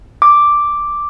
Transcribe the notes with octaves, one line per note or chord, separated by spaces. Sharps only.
D6